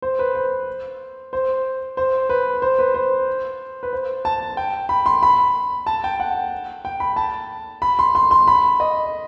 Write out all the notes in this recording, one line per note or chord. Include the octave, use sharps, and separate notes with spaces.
C5
B4
C5
C5
C5
B4
C5
B4
C5
B4
C5
A5
G5
B5
C6
B5
A5
G5
F#5
G5
B5
A5
B5
C6
C6
C6
B5
D#5